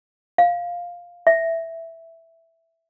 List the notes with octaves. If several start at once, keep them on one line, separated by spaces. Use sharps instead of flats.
F5
E5